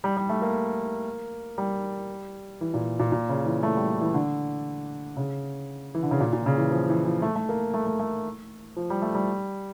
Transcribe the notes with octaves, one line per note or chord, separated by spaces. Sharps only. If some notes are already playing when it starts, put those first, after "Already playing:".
G3
G3
A3
A#3
G3
E3
A#2
A#2
A#2
C#3
E3
A3
G3
E3
D3
C#3
E3
D3
C#3
A#2
A#2
C#3
E3
F3
E3
F3
A3
A3
A#3
A3
A3
A3
F3
G3
A3
G3